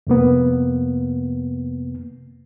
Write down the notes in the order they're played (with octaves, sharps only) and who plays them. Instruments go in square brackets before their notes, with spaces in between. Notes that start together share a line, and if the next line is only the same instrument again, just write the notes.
[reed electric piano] F2 C3 A#3 B3